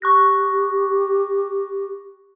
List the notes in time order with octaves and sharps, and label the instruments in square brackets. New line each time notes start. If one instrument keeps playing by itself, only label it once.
[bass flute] G4 [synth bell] C#6 F#6 A#6